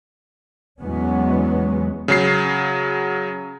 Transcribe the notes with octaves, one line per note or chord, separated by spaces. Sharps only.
E2 F#3 G#3 B3 C#4
C#3 F#3 C7